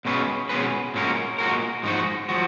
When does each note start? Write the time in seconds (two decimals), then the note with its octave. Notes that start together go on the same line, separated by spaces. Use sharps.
0.05 B2 G#3 C#4 G#4 B4
0.49 B2 G#3 C#4 G#4 B4
0.94 A#2 G#3 C#4 F#4 A#4
1.38 A#2 G#3 C#4 F#4 A#4
1.83 G#2 F3 G#3 D#4 F#4
2.29 F3 F#4